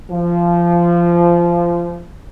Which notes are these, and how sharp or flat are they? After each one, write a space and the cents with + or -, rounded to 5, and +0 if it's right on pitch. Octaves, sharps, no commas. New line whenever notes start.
F3 -20